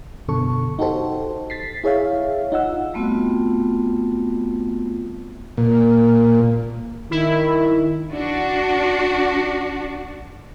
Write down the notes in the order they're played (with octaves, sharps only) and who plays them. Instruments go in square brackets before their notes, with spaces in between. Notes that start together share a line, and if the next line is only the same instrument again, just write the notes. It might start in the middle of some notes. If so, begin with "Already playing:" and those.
[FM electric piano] F#2 B2 D3 A4 C#6
D#4 F#4 G4 A4 C5
A6 B6 C7
E4 G#4 C#5 E5 F5
D#4 F4 F#5 E6
[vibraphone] G3 A3 B3 C4 F4 F#4
[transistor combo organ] A#2
[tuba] D#3 [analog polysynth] E4
[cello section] D4 F#4